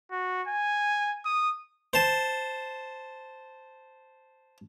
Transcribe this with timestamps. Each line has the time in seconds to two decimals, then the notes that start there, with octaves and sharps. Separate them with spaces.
0.12 F#4
0.48 G#5
1.25 D#6
1.93 C5 A5